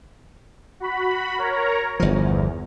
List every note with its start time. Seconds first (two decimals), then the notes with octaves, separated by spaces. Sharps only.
0.80 F#4 B5
1.38 A#4 C#5 A#5
2.00 G1 E2 F3